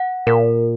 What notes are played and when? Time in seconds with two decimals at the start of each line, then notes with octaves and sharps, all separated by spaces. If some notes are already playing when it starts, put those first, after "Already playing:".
Already playing: F#5
0.27 A#2 A#4